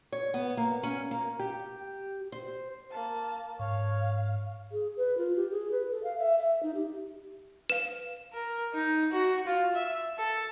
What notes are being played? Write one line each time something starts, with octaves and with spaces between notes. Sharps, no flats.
C#5
B3
A#3
C#4
A#3
G4
C5
A#3 A5
G#2 C#5 F5
G#4
B4
F4
G4
G#4
B4
A4
F5
E5
E5
D#4
G4
B4 F5 E7
A#4
D#4
F#4
F4
E5
A4